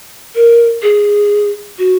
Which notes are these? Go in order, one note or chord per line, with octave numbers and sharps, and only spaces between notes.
A#4
G#4
F#4